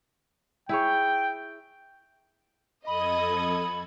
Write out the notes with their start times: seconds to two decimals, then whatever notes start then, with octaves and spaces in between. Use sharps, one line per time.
0.69 E4 G#4 C#5 G5
2.87 F2 A4 D#5 B5 D#6 G#6